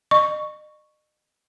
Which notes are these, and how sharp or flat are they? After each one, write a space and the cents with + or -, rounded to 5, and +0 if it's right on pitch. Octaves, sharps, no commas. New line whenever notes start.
D#5 -40 C#6 +0